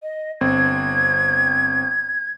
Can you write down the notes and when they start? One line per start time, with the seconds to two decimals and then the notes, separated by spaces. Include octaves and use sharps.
0.03 D#5
0.41 G1 C4 G#6